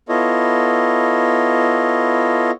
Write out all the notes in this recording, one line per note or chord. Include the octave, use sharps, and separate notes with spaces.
B3 E4 F4 A4 C#5 D#5